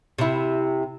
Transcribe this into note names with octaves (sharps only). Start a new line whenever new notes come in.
C3 E4